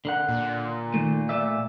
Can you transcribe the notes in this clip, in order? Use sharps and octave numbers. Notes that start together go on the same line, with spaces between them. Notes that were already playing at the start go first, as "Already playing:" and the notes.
D3 A#4 F#5
A#2
D#3 A3
A3 D5 E5